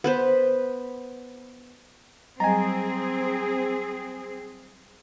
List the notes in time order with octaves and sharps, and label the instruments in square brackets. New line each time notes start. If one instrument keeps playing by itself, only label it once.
[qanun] B3 B4 C5
[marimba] F#3 G3 D#5 [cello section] C4 G#4 [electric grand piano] G#5 A#5